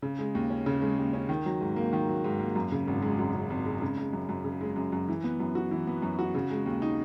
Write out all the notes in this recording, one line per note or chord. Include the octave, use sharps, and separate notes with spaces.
C#3
G#3
D#2
C#4
C#3
G#3
D#2
C#4
D#3
F#3
G#2
A#3
D#3
F#3
G#2
A#3
F#2
C#3
G#1
G#3
F#2
C#3
G#1
G#3
C#3
G#3
F#2
F#2
C#3
G#3
F#2
F#2
E3
B3
F#2
F#4
E3
B3
F#2
F#4
C#3
G#3
D#2
D#4